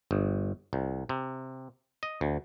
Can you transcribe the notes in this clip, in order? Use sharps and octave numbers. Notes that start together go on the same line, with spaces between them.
G1
C2
C3
D#5
D2